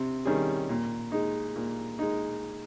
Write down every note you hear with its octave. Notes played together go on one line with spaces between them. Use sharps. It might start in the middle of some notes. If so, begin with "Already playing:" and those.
Already playing: C3
D#3 G3 C#4 G#4
A#2
G#3 D#4
A#2
G#3 D#4